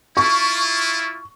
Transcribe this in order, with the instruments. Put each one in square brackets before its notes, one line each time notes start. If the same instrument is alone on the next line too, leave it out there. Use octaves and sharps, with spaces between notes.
[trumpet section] E4 F4 [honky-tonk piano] C#6